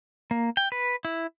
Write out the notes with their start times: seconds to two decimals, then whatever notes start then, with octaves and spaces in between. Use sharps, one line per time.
0.31 A#3
0.57 G5
0.72 B4
1.05 E4